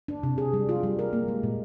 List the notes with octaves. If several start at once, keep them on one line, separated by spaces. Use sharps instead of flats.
D4
C3
G#4
G3
F4
G3
A#4
A#3
G#3
A#2